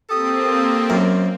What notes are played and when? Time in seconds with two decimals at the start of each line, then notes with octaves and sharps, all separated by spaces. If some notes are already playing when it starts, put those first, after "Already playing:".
0.10 A#3 C4 G4 A4 D#6
0.90 F#2